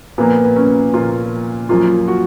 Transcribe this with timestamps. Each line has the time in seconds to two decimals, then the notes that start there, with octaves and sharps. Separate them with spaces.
0.18 A#2 F3 A#3 B3
0.45 B3
0.56 C#4
0.94 A#2 F3 A#3 F4
1.69 F#2 F3 A#3 F4
2.08 F#4